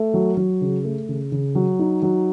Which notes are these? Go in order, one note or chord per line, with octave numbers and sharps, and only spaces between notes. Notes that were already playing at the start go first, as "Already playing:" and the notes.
Already playing: A3
F#3
F#3
C#3
A3
C#3
C#3
F#3
D#4
F#3